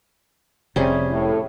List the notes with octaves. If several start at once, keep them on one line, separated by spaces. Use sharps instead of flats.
F1 C3 G3 C#4 G#4
A2